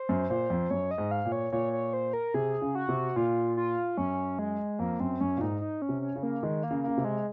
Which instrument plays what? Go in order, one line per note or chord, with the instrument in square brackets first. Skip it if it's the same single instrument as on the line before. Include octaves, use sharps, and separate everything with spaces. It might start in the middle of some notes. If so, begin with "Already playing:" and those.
Already playing: [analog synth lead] C5
[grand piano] F#2
[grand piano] A#2 [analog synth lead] C5
[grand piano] F2
[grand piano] F#2 [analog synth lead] C#5
[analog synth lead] D#5
[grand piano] G#2
[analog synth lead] F5
[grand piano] A#2
[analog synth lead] C#5
[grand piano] A#2 [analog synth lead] C#5
[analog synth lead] C#5
C5
A#4
[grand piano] C3 [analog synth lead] G#4
[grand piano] C#3
[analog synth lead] F#4
[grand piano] C3
[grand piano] A#2 [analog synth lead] F4
[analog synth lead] F4
[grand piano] F#2 [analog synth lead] C#4
[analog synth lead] G#3
[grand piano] F2 [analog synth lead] A#3
[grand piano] F#2 [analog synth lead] C4
[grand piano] F#2 [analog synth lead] C#4
[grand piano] A#2
[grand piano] G#2 [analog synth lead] D#4
[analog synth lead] D#4
C#4
[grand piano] C3
[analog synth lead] C#4
[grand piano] C#3
[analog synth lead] A#3
[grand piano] D#3 [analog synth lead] G#3
[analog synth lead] A#3
[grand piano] C#3
[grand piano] C#3 [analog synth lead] A#3
[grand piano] C3
[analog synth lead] G#3